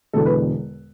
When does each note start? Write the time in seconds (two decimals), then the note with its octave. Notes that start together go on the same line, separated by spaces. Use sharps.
0.13 E1 E2 D3 A4
0.26 B4